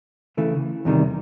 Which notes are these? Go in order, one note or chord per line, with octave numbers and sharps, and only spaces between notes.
C#3 E3 A3
E2 C3 D#3 G3